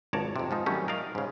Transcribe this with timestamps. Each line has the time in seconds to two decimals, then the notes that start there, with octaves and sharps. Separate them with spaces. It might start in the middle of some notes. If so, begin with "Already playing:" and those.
0.13 G#1 C#2 C#5 D5 A5 A#5
0.36 F2 C3
0.51 G#2 F3 D#4
0.66 D#3 F#3 G3 A3 C#4
0.88 A#4 D5 D#5 F5 A#5
1.15 G#2 C#3